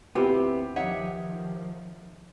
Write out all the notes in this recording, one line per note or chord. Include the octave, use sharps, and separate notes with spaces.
D2 B3 C4 E4 F4 G4
D#3 F3 D#4 C#5 E5 F#5